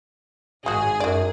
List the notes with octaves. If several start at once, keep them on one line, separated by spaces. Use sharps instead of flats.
G#1 G#3 F#4 G#4
F#2 F#4 D5